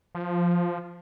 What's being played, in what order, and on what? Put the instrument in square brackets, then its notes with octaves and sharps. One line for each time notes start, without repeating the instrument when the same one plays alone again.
[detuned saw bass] F3